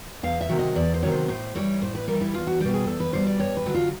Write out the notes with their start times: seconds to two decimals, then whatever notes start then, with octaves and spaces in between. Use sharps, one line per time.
0.23 E2 F5
0.41 E5
0.49 C3 D#3 F#3
0.59 D#5
0.76 E2 D5
0.94 C5
1.03 C3 D#3 F#3 C#5
1.11 C5
1.28 A2 C5
1.55 E3 G3 C#5
1.82 A2 C5
1.95 B4
2.08 E3 G3 A#4
2.21 E4
2.34 E2 F4
2.47 F#4
2.60 B2 G3 G4
2.74 G#4
2.87 E2 A4
3.00 B4
3.13 B2 G3 C5
3.27 D5
3.40 G2 C#5
3.57 B4
3.66 D3 F#3 F#4
3.74 F4